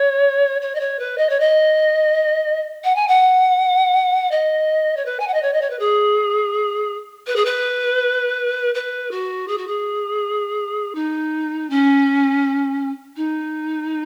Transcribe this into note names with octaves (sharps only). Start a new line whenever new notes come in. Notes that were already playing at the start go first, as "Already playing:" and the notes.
Already playing: C#5
C#5
D#5
C#5
B4
D#5
C#5
D#5
F#5
G#5
F#5
D#5
C#5
B4
G#5
F#5
D#5
C#5
D#5
C#5
B4
G#4
B4
G#4
B4
B4
F#4
G#4
F#4
G#4
D#4
C#4
D#4